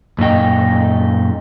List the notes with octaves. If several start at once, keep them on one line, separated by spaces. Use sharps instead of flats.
F#2 A#2 D#4 G5